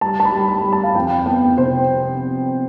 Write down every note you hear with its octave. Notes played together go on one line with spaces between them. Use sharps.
G3 A5
A5
B5
G3
B5
G3
A5
F5
F2 G5
B3 G5
C3 C5